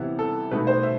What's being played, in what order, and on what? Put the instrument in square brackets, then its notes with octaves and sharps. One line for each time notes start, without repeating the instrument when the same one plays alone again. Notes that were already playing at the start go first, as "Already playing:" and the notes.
Already playing: [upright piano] C3 E3 B3 E4
A4
B2 A3 D#4 B4
C5
E5